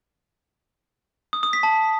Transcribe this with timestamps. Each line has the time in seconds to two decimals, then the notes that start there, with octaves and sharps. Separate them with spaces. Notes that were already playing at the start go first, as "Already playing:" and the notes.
1.33 D#6
1.43 D#6
1.53 B6
1.63 A5